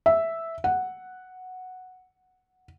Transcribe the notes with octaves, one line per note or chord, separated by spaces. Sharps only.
E5
F#5